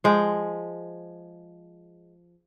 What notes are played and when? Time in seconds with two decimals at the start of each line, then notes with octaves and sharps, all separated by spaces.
0.04 F3 G#3 G5